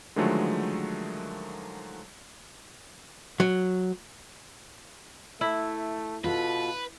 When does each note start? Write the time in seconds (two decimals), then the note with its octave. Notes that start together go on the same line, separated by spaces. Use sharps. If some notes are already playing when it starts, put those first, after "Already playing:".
0.16 D3 D#3 F3 F#3 G#3 A3
3.40 F#3
5.41 A3 E4
6.24 B2 F4 A4 B4